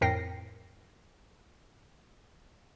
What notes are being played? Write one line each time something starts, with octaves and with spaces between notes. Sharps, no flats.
F2 A2 A#4 G5 A#6 C7